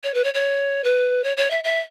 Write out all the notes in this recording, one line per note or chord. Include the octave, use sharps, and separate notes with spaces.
C#5
B4
C#5
C#5
B4
C#5
C#5
E5
E5